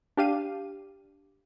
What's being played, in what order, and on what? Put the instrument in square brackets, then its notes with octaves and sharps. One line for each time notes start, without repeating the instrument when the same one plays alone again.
[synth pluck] D4 G4 F5 D#7